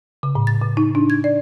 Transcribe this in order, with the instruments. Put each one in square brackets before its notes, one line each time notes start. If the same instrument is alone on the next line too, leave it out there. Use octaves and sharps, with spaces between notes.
[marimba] C#3
A2
A6
C#3
D#4
D4
G#6
D5